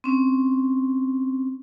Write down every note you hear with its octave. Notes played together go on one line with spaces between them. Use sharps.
C4 C#4